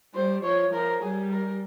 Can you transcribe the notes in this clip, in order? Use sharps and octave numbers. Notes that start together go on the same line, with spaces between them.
G3 C5
F3 C#5
F3 A#4
G3 G#4
A#4